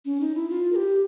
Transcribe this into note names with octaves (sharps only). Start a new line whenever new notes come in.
C#4
D#4
E4
F4
A#4
G4